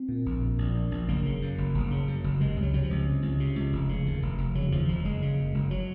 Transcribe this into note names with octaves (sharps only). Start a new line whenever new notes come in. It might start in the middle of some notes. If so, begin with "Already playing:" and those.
Already playing: C4
A#2
A#1
A#2
A#1
A#2
A#1
F#1 A#3
C#3
F#2
F#1
F#1
C#3
F#2
F#1
C3 G#3
C#2
F#3
C3 F#3
F3
C#2
C3
C#2
C3
C#2
F1
C#3
D#2
F1
F1
C#3 F#3
D#2 F3
F1 F3
F#1 G#3
C#3
F#2
F#1
F#3